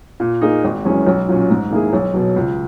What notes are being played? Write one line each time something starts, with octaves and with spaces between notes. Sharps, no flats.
A#2
A#3 D#4 G#4
G#1
F#2 E3 G#3 C#4
B1
A#2 F#3 C#4
G#2
D#3 A#3 E4 G#4
B1
B2 F#3
C#2